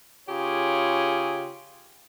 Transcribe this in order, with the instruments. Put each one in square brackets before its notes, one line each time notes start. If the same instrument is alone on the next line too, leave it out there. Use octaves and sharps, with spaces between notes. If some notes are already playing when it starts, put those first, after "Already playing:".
[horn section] C#3 F4 G4 G#4 C#5